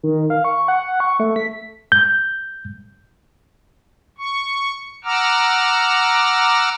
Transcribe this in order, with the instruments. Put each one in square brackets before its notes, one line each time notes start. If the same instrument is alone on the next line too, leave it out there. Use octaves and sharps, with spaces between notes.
[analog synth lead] D#3
F5
C#6
F#5
C#6
A3
B6
[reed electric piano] G6
[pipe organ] C#6
F#5 A#5 D6 E6 F6